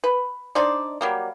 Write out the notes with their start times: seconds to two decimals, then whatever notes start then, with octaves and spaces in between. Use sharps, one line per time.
0.04 B4
0.55 D4 D#4 C5 D5
1.01 F#3 G3 A#3